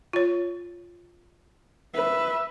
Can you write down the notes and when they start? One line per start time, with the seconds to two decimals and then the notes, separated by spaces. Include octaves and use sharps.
0.13 F4 C#5
1.95 B4 E5